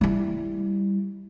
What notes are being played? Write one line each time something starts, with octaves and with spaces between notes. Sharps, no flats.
G3 E4